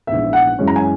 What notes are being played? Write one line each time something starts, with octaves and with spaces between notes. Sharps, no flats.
A#1 G#2 E3 B3 E5
F#5
F#2 E3 G#3 C#4
A#5
G#5